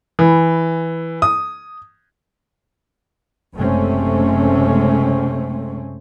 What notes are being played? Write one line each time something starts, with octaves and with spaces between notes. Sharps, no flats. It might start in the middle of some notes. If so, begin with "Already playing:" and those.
E3
D#6
F#1 C3 G#3 A3 C4 C#4